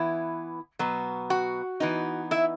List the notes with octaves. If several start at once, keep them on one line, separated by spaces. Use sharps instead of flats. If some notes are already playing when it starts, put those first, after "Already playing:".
Already playing: E3 B3 E4
B2 F#3 B3
F#4 F#5
E3 B3 D#4
E4 E5